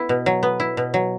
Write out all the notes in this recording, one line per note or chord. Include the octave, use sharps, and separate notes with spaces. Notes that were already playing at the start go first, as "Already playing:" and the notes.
Already playing: B3 E4
B2
F#3
B3
E4
B2
F#3